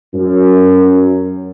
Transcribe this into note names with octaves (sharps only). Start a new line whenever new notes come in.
F#2